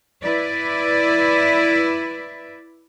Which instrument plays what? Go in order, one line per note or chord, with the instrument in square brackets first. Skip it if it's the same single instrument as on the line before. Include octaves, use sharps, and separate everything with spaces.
[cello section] E4 B4 D5